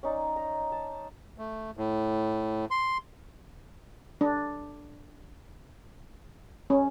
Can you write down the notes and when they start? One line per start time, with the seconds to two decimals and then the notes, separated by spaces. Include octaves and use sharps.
0.03 C#4 D#4 D5
0.36 A#5
0.72 A5
1.38 A3
1.77 A2
2.71 C6
4.21 D4
6.70 C#4